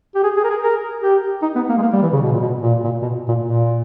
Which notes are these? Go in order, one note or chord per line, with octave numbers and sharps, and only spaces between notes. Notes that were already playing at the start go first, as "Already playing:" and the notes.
G4
G#4
G#4
A#4
G#4
A#4
G4
D#4
B3
A#3
G#3
A#3
G3
E3
C#3
B2
A#2
B2
A#2
A#2
B2
A#2
A#2